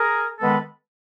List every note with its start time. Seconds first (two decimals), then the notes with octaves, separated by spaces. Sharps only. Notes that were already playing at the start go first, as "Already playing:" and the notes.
Already playing: G#4 A#4
0.40 D#3 G#3 B3 A4 B4